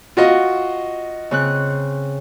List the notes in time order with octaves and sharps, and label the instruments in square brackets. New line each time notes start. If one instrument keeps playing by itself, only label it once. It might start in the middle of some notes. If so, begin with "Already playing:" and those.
[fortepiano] F4 F#4 D#5
[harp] C#3 C4 F#6